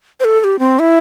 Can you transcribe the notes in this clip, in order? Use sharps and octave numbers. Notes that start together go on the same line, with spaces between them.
C5
A4
A4
G4
C4
E4